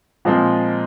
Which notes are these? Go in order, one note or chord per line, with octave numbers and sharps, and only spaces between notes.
A#2 F3 G#3 C4